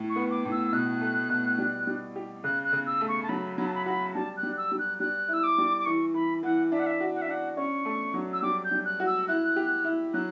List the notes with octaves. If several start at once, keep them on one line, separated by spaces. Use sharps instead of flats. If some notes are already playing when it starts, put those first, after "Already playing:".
Already playing: A2
C#6
B3
D6
A2
E6
E6
B2 F#6
A3
B2
G3
G3
G4
C#3 F#6
F#6
C#3
E6
A3
C#6
A5
F#3 B5
F#3 B5
A5
B5
F#4 B5
G3 A5
F#6
G3
E6
G3
F#6
G3 F#6
E4 E6
D6
G3
D6
E3 C#6
E3 B5
E3 F#5
D4 E5
F#5
E5
F#4
F#5
E5
D4 F#5
C#4 C#6
A3
F#3
E6
G3 D6
G6
G3
F#6
F#4
E6
E4 F#6
G4
E4
F#3 F#6